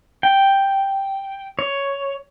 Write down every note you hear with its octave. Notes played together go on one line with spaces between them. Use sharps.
G5
C#5